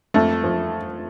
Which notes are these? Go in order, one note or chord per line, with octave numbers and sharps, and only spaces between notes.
F2 A3
F3